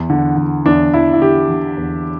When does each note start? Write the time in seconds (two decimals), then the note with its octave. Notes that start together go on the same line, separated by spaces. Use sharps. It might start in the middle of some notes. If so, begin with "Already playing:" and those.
Already playing: E2
0.10 D3
0.37 D3
0.66 E2 D4
0.94 E2 E4
1.13 E4
1.22 D3 G4
1.50 D3
1.78 E2